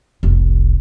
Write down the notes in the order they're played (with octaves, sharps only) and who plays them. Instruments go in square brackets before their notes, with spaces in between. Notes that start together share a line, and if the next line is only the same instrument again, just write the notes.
[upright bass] F1 C2